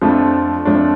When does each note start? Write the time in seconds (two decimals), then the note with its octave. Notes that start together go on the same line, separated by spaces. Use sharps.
0.02 F2 F3 A3 D4
0.65 F2 F3 A3 D4